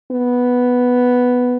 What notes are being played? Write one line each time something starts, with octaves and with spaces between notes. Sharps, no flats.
B3